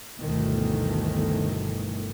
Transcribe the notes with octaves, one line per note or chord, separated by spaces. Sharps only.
G1 D2 B2 D#3 E3 A3